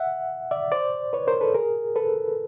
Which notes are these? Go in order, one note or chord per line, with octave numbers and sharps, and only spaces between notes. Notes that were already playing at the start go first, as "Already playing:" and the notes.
Already playing: E5 F#5
D5 E5
C5 D5
B4 C#5
A#4 C5
A4 B4
G#4 A#4
A4 B4